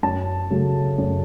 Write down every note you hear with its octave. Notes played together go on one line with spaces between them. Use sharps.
F#2 A5
C#3 F#3 A3
F#2